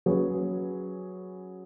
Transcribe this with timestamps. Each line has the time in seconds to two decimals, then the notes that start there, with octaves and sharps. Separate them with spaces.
0.06 F#3 C#4 G#4 B4